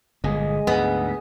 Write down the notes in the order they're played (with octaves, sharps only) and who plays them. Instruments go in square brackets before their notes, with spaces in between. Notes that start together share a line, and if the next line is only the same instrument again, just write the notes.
[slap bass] G1 A#2 [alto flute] G#3 [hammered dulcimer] G#4 D#5
[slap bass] D2 G#2 [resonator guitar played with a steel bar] B3 [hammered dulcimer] D#5 G#5